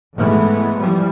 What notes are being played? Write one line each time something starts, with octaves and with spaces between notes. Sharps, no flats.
G#2 E3 G#3 A3 B3
E3 F3 G3